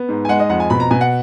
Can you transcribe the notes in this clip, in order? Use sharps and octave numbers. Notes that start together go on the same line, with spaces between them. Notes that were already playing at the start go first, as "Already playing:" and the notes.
Already playing: B3
G#2
G#5
G#3 F#5
D#5
F2 F#5
G#5
B2 B5
A#5
B2 G#5
F#5